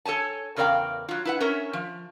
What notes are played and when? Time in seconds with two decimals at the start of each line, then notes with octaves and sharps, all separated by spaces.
0.05 A4 C#5 G#5 A5
0.56 E2 C#3 A#4 D5 F5 G5
1.09 F#3 F4
1.25 E4 B4 F#5
1.40 C#4 A#4 C#5 E5
1.73 F3